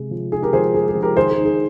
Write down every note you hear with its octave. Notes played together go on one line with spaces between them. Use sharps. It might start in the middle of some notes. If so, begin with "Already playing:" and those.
Already playing: C3 G#3
F3
G#3 G#4
G4 A#4
F3 G#4 C5
G#3 G#4
G#4
F3
G4 A#4
D#3 G#4 C5
G#4
D#4
G#4